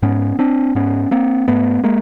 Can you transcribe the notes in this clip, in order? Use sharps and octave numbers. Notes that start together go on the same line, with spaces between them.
G#2 B3 C#4
C4 D4
G#2 B3 C#4
A#3 C4
G#2 A3 B3
G#3 A#3